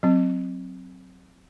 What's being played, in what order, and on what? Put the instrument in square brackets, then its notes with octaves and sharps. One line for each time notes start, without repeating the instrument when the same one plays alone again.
[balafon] F#3 C4